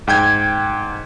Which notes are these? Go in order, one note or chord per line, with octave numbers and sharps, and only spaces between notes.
G#2 G5 G6 G#6